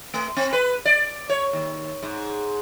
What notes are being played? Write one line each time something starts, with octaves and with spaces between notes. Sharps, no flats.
A3
C4
B4
D5
C#5
D#2
G#2